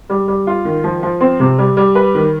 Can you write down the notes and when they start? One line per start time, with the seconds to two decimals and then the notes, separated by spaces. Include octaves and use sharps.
0.10 G3
0.28 G3
0.47 F4
0.65 D#3
0.84 F3
1.03 F3
1.21 C4
1.40 C3
1.58 G3
1.77 G3
1.95 B4
2.15 D#3